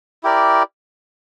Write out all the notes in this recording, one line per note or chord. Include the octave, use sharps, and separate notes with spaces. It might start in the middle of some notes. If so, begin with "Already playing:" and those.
E4 G4 A#4 D5